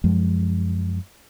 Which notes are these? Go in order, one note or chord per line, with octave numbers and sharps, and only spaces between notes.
F#2 F3 G#3